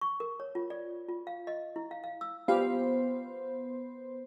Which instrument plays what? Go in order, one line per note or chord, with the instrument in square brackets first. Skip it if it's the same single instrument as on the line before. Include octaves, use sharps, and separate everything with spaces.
[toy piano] C#6
A#4
C#5
F4
D5
F4
F5
D#5
E4
F5
F5
E6
[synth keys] B3 C5 [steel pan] F4 G4 F5